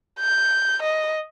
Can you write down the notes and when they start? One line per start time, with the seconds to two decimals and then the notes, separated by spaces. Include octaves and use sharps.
0.20 G6
0.82 D#5